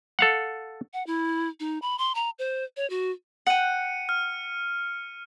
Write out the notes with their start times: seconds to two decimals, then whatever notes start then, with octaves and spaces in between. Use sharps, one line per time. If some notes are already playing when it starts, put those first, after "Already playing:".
0.19 A4 F5 F#5
0.93 F#5
1.07 E4
1.60 D#4
1.82 B5
1.98 C6
2.15 A#5
2.39 C5
2.77 C#5
2.90 F#4
3.47 F#5 G5 C#7 D#7
4.09 F6